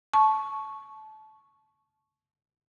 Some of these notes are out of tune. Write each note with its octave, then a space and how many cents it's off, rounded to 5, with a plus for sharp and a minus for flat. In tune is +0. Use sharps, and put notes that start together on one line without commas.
A5 -20 C#6 +0